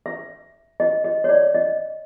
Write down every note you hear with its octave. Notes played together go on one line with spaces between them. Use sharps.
E5
D#5
D#5
C#5
D5
D#5